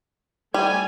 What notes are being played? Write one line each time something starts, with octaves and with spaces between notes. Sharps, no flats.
G3 A3 G#5